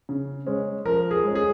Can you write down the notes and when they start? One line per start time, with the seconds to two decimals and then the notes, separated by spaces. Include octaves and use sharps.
0.09 C#3
0.47 G#3 C#4
0.85 F3 A#4
1.11 G#4
1.24 G#3 C#4
1.35 G#4